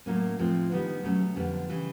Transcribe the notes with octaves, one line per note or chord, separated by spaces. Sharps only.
A2 F#3 A#3 C#4
A2 F3 G#3 C4
D#3 G3 B3 D4
B2 F#3 A3 C#4
F2 D3 G3 B3
C#3 E3 G3